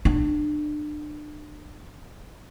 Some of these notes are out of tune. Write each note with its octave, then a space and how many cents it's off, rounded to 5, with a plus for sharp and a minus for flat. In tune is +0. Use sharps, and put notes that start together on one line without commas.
D4 +30